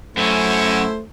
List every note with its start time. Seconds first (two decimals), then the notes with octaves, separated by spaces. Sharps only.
0.17 F#2 A3 C#4 E4 C5